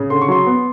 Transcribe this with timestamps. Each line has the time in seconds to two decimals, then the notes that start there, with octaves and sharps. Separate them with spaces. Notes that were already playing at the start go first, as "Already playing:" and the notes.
Already playing: C#3
0.10 D3 C6
0.21 C#6
0.28 F#3 C6
0.47 B3